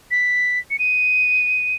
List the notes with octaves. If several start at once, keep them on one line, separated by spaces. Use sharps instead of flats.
B6
C#7
D#7